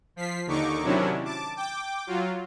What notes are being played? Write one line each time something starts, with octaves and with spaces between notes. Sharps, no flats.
F3 B6 C7
D#2 D3 D#4 C#6 D6
C3 D#3 F#3 C#4 D4 E4
A5 D6
G5 D6
F#3 F4